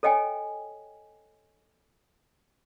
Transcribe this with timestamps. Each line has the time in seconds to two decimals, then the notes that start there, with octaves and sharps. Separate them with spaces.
0.03 A4 C#5 D#5 G5 G#5